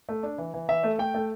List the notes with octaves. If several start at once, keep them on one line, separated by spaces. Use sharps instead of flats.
A3
D4
E3
E3
E3 E5
A3
A3 G5
A3